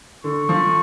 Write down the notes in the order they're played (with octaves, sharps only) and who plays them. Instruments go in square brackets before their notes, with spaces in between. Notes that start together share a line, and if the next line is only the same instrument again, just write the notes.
[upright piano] D3 [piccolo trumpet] C#6
[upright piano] F3